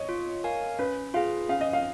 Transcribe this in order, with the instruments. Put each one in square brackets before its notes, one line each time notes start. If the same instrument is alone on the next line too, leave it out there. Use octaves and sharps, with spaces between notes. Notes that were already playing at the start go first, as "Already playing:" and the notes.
Already playing: [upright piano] C#5 D#5
[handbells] F4
A#4 F5 G#5
[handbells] C#4 [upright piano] B4
[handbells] F4 G#4 [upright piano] F5
[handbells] C#4 [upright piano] F5
[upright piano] D#5
F5